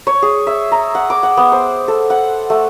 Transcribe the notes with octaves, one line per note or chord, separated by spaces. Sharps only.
C#5
G#4
E5
A#5
F#5
D6
F#5
B3
C5
A4
F#5
A3